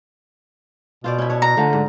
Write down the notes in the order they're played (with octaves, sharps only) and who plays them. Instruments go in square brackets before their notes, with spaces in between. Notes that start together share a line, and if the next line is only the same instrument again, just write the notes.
[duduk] B2 [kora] F4 C5 D5
[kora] C#4 E4
D4 C#5
[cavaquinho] A#5
[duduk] D3 [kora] F3 A3 F5
[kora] G#2